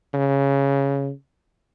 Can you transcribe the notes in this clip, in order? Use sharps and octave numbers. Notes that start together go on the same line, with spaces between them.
C#3